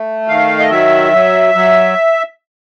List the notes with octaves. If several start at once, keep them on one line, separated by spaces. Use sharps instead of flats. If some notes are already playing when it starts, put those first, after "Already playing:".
Already playing: A3
D#3 F5
D#5
F#3 E5
F#3
F#3